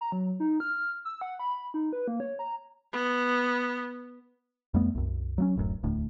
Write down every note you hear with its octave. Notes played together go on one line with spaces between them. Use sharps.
A#5
F#3
D#4
F6
E6
F#5
B5
D#4
B4
A#3
C#5
A#5
B3
F2 G3 A3 B3
C2 F#2
F#3 A3 C#4
D1 A1 F#2
E1 D2 A2